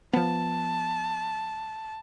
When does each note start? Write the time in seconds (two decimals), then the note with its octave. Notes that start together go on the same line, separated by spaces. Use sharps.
0.13 F3 B3 A5